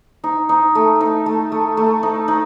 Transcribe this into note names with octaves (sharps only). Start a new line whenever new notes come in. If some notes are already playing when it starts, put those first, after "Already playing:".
D#4
D#4
A3
D#4
A3
A3
A3
D#4
D#4